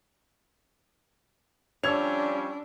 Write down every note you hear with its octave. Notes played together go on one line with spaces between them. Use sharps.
F3 G3 C#4 D4 C#5 E6 G#6 F7